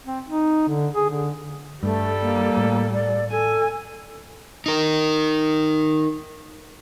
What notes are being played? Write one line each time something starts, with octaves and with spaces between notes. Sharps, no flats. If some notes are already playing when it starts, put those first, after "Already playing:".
C4
D#4
D3
G#4
D3
G2 G3 A3 A4
A#3
A2
D5
A4 G#5
D#4 A#4